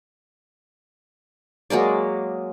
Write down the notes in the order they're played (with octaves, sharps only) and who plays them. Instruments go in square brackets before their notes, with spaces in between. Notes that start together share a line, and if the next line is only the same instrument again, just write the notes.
[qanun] F#3 G#3 A#3 D5